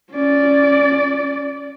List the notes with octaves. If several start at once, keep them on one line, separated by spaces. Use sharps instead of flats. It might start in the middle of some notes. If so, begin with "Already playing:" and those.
C#4 D5